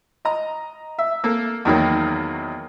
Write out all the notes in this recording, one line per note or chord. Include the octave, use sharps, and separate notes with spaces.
D#5 A#5
E5
A#3 A4
E2 D#3 F#3 A#3